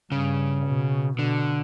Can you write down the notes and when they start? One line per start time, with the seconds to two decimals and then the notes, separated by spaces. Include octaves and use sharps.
0.12 G2 C#3
0.66 B2
1.19 B2 D3